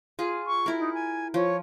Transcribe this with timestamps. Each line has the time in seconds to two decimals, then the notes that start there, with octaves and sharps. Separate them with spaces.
0.19 F4 G#4
0.46 C#6
0.66 E4 A#4
0.78 D#4
0.94 G#5
1.34 F3 C#5